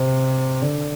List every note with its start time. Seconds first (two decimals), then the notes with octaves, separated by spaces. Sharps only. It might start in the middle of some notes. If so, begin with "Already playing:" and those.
Already playing: C3
0.62 D3